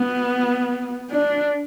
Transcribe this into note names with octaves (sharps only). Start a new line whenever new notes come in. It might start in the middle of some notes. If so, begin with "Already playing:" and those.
Already playing: B3
D4